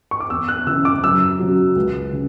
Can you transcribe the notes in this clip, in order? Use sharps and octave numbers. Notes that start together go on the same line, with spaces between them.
C#6
D6
E2 E6
F#6
C#3 E3 E6
D6
F#2 E6
C#3 F#3
C#2
C#3